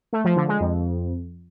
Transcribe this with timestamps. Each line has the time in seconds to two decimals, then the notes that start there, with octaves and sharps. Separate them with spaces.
0.13 A3
0.24 F3
0.36 D3
0.48 G#3
0.60 F2